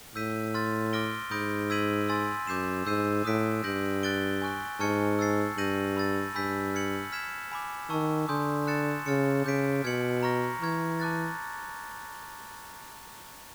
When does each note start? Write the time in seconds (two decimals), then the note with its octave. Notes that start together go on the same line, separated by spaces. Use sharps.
0.15 A2 E6 G6 B6 D#7
0.54 C6 F6 A6
0.93 D6 F6 A#6 D7 G7
1.31 G#2 B5 D#6 G6 A#6 D7
1.70 E6 G#6 B6 D#7 F#7
2.09 G#5 C6 E6 A6
2.47 F#2 D6 G6 C7 E7
2.86 G#2 E6 G6 C7 D#7
3.25 A2 D#6 F#6 B6 D7
3.64 G2 G6 A#6 D7 F#7
4.03 F#6 A6 D7 G7
4.42 G#5 C#6 F#6
4.80 G#2 A5 C#6 F6 G#6 C#7
5.19 E6 A6 C7
5.58 G2 G6 A#6 D#7 F#7
5.97 B5 E6 A6
6.35 G2 G#5 B5 E6 G6 B6
6.74 F6 G#6 C#7 F#7
7.12 F6 G#6 B6 E7
7.52 G#5 B5 D6
7.90 D#3 A5 C#6 E6
8.29 D3 G#5 C6 D#6 G6
8.67 F#6 A6 C#7 E7
9.06 C#3 F6 A6 C#7
9.45 C#3 D6 G6 B6 D7
9.84 B2 F6 G#6 C#7 F#7
10.23 A#5 C#6 F6 A#6
10.62 E3 A#5 C#6 F6 G#6
11.00 A5 D6 F#6 A6